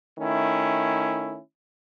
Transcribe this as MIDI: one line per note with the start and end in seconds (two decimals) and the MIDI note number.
0.18 1.38 51
0.18 1.38 57
0.18 1.38 61
0.18 1.38 64